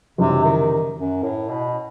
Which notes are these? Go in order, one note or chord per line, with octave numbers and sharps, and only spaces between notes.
F#1 F#2 C3 E3 G3 D#4
D#3
F#2
A2
B2